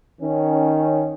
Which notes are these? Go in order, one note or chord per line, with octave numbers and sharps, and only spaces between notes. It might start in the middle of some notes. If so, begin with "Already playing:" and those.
D#3 C#4